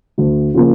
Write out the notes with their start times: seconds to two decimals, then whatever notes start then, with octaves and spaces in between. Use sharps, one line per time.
0.18 D2
0.54 C#3 F3 A#3